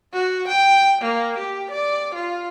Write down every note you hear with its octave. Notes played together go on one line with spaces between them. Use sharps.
F#4
G5
A#3
G4
D5
F4